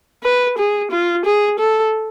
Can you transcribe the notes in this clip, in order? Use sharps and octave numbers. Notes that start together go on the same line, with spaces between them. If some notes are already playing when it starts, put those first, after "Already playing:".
B4
G#4
F4
G#4
A4